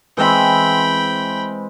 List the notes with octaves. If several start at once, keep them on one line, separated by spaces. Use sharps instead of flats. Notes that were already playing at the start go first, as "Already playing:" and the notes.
E3 G#3 C4 G5 B5